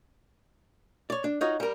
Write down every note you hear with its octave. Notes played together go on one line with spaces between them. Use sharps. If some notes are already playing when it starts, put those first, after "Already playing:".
C#5 D5
D4
D#4 F4 F#4 C#5 D#5
G3 A#4